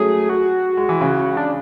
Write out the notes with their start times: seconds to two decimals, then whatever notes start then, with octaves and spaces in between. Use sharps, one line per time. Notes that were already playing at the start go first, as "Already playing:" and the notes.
Already playing: F#3 A3 C#4 G#4
0.29 F#4
0.77 G#3
0.89 E3
1.01 C#3
1.37 D4